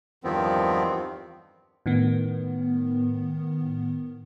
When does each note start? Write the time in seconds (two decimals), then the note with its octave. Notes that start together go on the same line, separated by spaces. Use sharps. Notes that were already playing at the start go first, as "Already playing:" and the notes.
0.24 E2 G2 D#3 F3 B3 C4
1.86 A2 D#3 B3